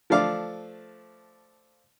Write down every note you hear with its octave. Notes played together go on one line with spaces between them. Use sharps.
F3 A3 D4 F5 D6